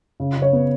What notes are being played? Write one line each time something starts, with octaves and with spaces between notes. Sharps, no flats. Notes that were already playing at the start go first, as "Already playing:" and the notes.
C#3
C#3
C#5
B3